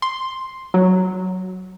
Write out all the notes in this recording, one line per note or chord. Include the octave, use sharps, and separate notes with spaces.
C6
F#3